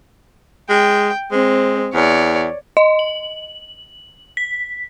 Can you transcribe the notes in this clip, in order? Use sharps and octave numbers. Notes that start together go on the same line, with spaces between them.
G#3 G5
G#3 C4
E2 C#5 D5
D#5
F#7
B6